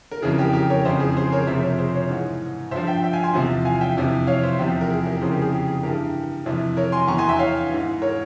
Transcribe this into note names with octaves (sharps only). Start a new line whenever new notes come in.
A#4
F2 C#3 E3 G#4
G4 A#4
G4 A#4
A#4 C#5
F2 C#3 E3 C5 E5
G#4
G#4 C5
A#4 C#5
F2 C3 F3 C5 E5
A#4 C#5
G#4 C5
A#4 C#5
G#2 E3
G2 F3 C5 E5
E5 G5
E5 G5
F5 G#5
G#5 C6
E2 C3 F3
F5 G#5
E5 G5
F2 C3 E3
C#5 F5
C5 E5
E2 C3 F3 G4
A#4
G#4
G4 A#4
F2 C#3 E3 G#4 C5
G4 A#4
G#4
G4
G#4
G2 E3 G4 A#4
F2 C3 E3
A#4 C#5
G#5 C6
E2 E3 A#5 C#6
G#5 C6
E5 G5
C#5 F5
G#2 E3
A#4 C#5